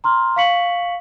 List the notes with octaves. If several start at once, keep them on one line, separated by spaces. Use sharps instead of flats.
A#5 C6 F6
F5 C#6 B6 C#7 F#7